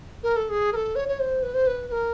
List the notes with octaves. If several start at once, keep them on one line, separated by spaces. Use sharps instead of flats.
A#4
A4
G#4
A#4
A4
C#5
C#5
C5
B4
C5
B4
B4
A#4